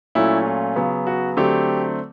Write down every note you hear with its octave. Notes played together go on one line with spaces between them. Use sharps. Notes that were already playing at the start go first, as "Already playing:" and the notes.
A#2 F#3 A3 C#4 E4
F4
C#3 F#3 B3
F#4
D3 F#3 A3 C4 G4